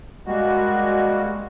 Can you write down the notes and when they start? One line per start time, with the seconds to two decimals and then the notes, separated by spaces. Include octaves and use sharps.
0.27 G3 G#3 A#3 F#4